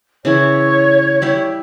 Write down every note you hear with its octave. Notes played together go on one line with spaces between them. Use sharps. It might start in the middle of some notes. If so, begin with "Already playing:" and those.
C#3 E3 E4 C#5
G3 E4 G4